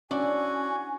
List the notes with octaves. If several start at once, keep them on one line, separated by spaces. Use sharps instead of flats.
C#4 D4 E4 F#4 G#5 C#6